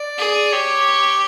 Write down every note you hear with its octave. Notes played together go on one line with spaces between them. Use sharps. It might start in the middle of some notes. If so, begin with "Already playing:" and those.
Already playing: D5
G#4
G4 C#5